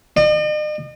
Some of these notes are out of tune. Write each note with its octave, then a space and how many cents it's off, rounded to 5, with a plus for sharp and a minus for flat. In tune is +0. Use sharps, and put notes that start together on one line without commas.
D#5 -45